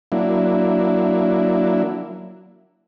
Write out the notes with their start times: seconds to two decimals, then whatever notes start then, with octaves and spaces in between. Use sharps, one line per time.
0.12 F#3 A#3 D4 E4